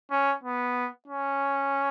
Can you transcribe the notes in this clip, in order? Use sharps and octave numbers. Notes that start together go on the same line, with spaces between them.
C#4
B3
C#4